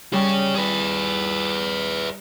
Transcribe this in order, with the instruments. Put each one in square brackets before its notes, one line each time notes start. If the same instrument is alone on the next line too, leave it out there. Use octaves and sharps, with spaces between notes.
[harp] G3 [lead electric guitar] G#4 C#5
[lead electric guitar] G#4 B4